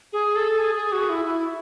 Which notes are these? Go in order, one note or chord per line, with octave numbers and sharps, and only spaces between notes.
G#4
A4
G#4
G#4
F#4
E4
E4